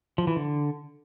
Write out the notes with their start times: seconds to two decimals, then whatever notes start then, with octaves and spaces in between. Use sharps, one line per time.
0.18 F3
0.27 E3
0.36 D3